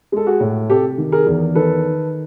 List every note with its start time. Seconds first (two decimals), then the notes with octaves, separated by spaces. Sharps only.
0.12 G#3 A4
0.27 F#4 G#4
0.40 A2
0.69 C3 G4 A4
0.98 D#3
1.12 G#4 A#4
1.26 E2
1.55 D#3 A4 B4